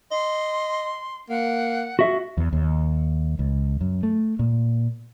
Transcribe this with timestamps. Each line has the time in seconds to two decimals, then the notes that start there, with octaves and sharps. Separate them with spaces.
0.12 D#5 C6
1.30 A#3 F#5
1.99 F#4 E5
2.37 E2
2.53 D#2
3.39 C#2
3.81 F#2
4.03 A3
4.39 A#2